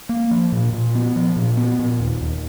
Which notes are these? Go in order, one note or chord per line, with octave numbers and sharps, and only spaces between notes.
A#3
F3
A#2
A#2
B3
F3
A#2
B3
A#2
D#2
D#2